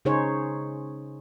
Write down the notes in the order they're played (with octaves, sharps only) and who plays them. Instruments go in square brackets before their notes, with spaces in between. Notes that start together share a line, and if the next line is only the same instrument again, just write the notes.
[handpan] C#3 D#4 G#4 C5 C#5